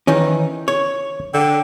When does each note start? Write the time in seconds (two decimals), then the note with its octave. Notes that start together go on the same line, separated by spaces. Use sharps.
0.07 D#3 E3 C#4 D#4
0.68 C#5
1.34 D3 G5